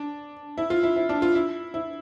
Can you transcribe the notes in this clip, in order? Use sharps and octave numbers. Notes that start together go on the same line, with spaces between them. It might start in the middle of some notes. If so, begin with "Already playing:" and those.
Already playing: D4
E4
F4
E4
E4
D4
F4
E4
E4